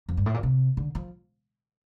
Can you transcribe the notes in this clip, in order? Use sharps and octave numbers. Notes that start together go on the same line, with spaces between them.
F2
G2
A2
A#2
C3
D3
F3